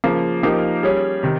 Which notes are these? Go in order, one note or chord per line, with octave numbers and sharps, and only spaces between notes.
C#3 F3 A#3
F3 A#3 D#4 G4 A#4
G3 C#4 G#4 C#5
C3 D#3